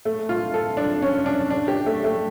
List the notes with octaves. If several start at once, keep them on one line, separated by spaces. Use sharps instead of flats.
A3
F4
A4
D4
C#4
D4
D4
G4
A3
A3